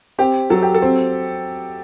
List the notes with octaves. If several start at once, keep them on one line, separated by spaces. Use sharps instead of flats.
C4 G4
F#3 A4
G4
A4
C4